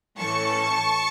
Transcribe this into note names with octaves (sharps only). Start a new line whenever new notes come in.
A2 E3 A3 C#4 A5 C#6